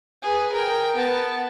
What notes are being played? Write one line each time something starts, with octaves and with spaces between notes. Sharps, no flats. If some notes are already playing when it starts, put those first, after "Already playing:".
G#4 B4
A#4 G5
B3 A5